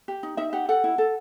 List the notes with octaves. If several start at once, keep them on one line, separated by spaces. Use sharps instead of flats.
G4
D#4
D#4 E5
G4 F#5
A4 F#5
E4
A4